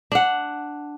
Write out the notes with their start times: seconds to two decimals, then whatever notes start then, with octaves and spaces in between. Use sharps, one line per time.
0.12 D4 F#5